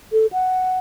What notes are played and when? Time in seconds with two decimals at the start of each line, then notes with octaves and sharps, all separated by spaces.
0.13 A4
0.32 F#5